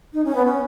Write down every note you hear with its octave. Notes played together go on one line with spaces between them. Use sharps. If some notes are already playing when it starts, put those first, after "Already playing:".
D#4
C#4
B3
C#4